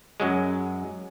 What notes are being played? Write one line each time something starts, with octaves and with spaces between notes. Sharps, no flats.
F#2 F#3 G#3